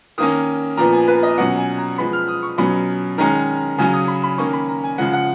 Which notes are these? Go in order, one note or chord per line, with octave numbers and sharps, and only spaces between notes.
D#3 A#3 C#4 D#6
A#2 F3 B3 A#5
G#5
B4
D#5
B2 F#3 C#4 F#5
G#5
A#5
F3 G#3 B3 B5
F6
D#6
C#6
B2 F#3 C#4 B5
D#3 G#3 C#4 A#5
C#3 F#3 C#4 G#5
D#6
B5
B5
D#3 A#3 C#4 C#6
B5
A#5
G#5
C#3 F3 G#3 F#5
F#5